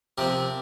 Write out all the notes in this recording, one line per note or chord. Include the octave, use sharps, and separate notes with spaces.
C3 F3 C4 G4 A#4